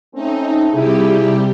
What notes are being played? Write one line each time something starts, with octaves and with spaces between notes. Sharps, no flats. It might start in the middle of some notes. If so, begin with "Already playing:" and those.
A3 C4 C#4 D#4
C3 G3 E4 F4 G4 G#4